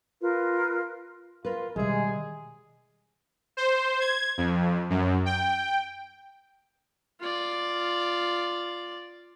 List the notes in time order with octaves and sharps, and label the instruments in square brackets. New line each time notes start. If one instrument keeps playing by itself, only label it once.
[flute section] F4 A#4 B4
[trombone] F4 [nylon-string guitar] A#4 B4
[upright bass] B2 D#3 [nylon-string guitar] G3 E5 [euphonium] G#3 [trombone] G#4
[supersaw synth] C5
G#6
F2
F#2
G5
[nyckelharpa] F4 D5